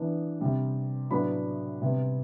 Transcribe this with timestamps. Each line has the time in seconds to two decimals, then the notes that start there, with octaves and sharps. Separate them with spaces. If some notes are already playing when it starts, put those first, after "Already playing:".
Already playing: E3 B3 D4
0.40 C3 G3 D4
1.11 A2 F#3 B3 D4 B5
1.82 C3 G3 B3